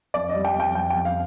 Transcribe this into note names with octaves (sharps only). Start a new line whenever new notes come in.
F2 D5
D#5
G3
G5
F2 G5
G3 G5
F2 G5
F5